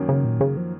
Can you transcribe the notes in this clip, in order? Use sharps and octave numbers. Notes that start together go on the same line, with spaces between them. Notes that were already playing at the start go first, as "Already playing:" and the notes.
Already playing: F#2 D#3 F#3 A#3 C#4
C#3
A#2
C#3
F3